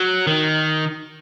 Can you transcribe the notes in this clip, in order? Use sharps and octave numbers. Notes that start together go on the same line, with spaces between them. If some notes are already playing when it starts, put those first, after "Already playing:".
Already playing: F#3
D#3